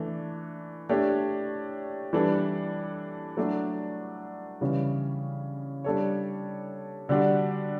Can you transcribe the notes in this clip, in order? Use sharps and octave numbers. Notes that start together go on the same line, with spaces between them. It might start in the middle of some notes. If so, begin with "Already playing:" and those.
Already playing: E3 A3 D4
A3 D4 G4 C#5
E3 G3 D4 A4
F#3 A3 D4
C#3 E3 G3 C#4
G3 D4 A4 C#5
D3 G3 D4 F#4